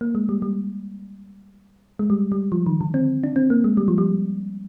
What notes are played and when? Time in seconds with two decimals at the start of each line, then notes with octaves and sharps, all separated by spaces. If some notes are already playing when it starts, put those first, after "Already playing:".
0.01 A#3
0.15 G#3
0.29 G3
0.42 G3
1.99 G#3
2.10 G3
2.32 G3
2.52 F3
2.66 D#3
2.81 D3
2.94 C4
3.24 D4
3.36 C4
3.50 A#3
3.64 G#3
3.77 G3
3.88 F3
3.98 G3